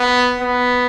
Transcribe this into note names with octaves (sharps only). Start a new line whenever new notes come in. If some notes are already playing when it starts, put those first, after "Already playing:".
Already playing: B3
B3